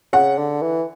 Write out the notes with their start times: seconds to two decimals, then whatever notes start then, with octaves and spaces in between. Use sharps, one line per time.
0.13 C#3 F#5
0.38 D3
0.62 E3